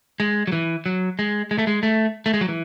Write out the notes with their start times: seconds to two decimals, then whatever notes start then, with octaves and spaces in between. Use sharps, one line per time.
0.20 G#3
0.47 F#3
0.52 E3
0.86 F#3
1.19 G#3
1.51 G#3
1.58 A3
1.67 G#3
1.83 A3
2.26 A3
2.34 G#3
2.41 F#3
2.48 E3